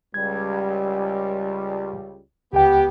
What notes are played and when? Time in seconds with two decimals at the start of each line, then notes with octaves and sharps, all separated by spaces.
0.14 C#2 G3 G#6
2.53 C#2 B3 G4 G5